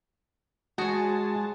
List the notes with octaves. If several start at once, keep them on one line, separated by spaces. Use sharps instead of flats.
G#3 F#4 G#4 C#5 A5